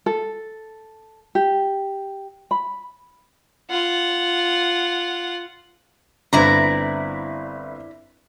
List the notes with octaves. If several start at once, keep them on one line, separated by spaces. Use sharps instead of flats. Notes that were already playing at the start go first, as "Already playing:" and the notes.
A4
G4
B5
F4 F#5
G1 C4 E4 B4 D5 A#5